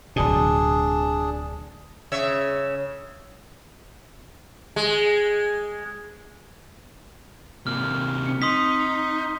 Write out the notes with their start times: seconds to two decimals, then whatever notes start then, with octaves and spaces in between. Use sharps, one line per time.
0.16 D1 B2 D4 G#4
2.12 C#3 C#5 E5
4.76 G#3
7.67 C3 A#3 F6
8.26 C4 C#7
8.42 D#4 C6 D#6 B6